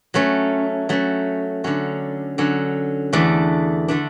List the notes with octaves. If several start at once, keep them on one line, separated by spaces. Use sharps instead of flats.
F#3 A3 C#4
F#3 A3 C#4
D3 F#3 C#4
D3 F#3 C#4
E2 D3 A3 D4
D3 A3 D4